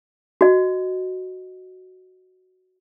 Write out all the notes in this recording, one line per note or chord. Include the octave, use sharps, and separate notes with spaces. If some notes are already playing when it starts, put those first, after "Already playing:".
F#4 D#5